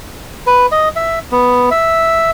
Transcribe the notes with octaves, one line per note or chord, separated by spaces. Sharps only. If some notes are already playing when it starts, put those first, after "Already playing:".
B4
D#5
E5
B3
E5